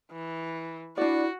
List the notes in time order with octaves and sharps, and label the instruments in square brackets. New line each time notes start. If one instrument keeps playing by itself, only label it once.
[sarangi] E3
[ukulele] D4 D5 [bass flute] E4 [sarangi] F#4